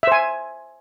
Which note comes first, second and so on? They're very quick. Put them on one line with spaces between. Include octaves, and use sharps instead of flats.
E5 C5 G#5